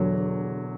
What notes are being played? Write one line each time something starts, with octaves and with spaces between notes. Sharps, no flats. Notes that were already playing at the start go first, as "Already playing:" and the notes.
Already playing: E1 E2 D3 F#3